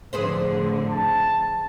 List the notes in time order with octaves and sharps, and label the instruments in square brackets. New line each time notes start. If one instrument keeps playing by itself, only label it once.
[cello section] F2 A2 D3 [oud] G#4 B4 C5
[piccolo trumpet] A5